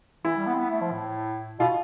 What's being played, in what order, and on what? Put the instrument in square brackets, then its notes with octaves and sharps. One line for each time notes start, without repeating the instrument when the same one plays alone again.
[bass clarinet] E3 [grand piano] E4
[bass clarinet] G3
B3
C4
B3
A3
F3
A2
[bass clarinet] B2 [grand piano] F4